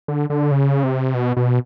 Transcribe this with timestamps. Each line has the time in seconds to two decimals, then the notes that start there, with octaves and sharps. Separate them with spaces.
0.08 D3
0.30 D3
0.51 C#3
0.84 C3
1.14 B2
1.37 B2